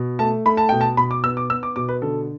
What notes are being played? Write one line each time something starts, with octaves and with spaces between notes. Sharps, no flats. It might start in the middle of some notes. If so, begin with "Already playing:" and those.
Already playing: B2
A3 A5
A3 B5
A5
B2 G5
A5
B2 B5
D6
B3 E6
D6
B3 E6
D6
B2 D6
B4
D3 A4